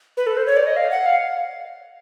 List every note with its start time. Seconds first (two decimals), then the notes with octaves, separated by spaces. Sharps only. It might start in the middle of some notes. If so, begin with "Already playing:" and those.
0.17 B4
0.27 A4
0.37 C5
0.46 C#5
0.57 D5
0.67 D#5
0.77 F5
0.91 F#5
1.06 F5